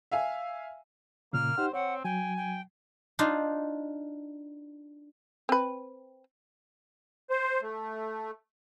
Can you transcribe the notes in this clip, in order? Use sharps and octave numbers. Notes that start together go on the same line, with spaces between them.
E5 F5 G#5
A#2 C#3 A#3 F6
D#4 G4 C5 F#5
C4 C#5 F#5
F#3 G5 G#5
G5
D4 D#4 F4
C4 B4
C5
A3